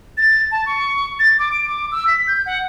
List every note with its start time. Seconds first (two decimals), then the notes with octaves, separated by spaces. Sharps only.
0.17 A6
0.52 A5
0.66 C#6
1.19 A6
1.39 D6
1.52 D7
1.68 D6
1.92 E6
2.07 B6
2.27 G6
2.46 F#5